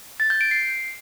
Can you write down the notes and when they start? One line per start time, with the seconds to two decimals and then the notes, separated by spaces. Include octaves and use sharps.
0.20 A6
0.30 G6
0.41 D7
0.51 C7